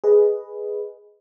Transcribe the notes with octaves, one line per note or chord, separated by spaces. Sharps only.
G#4 B4 D#5